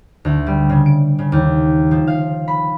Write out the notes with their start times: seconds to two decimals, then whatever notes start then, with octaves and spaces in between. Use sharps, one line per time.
0.25 D2
0.47 G3
0.70 C#3
0.86 D7
1.19 C#3
1.32 D#2
1.91 F3
2.07 F5
2.48 B5